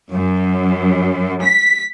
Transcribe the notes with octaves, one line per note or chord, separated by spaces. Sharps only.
F#2
B6